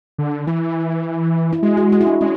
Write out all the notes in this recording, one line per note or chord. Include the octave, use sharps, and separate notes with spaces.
D3
E3 E4
E4
G#3 F#4
F#4
F#4
E4
D4
G#3 C#4